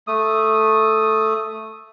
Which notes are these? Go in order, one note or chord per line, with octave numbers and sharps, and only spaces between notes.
A3 D#6